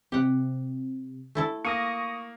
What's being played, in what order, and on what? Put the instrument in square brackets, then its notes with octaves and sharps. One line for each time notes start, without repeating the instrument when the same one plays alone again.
[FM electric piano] C3 [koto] G4 F#5
[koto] A3 E4 A4
[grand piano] A#3 [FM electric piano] C#6 D#6 A#6